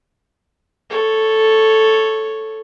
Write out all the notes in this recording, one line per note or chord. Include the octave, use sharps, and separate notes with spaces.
A4 C#5